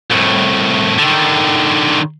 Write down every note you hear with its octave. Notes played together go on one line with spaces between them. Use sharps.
C2 A2
D3 D#3